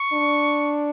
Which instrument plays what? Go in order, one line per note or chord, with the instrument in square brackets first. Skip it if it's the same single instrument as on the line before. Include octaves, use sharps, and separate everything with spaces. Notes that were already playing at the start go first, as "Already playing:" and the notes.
Already playing: [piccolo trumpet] C#6
[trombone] D4